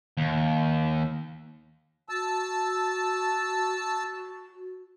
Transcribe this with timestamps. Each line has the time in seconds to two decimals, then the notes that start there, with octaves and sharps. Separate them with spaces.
0.18 D#2
2.09 F#4 A5 E6